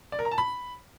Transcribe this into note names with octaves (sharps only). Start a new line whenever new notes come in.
D5
A#4
A#5
A5
B5